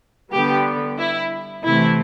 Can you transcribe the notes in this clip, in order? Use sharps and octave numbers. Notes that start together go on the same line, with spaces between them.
D3 G3 B3 G4
E4
C3 E3 A3 E4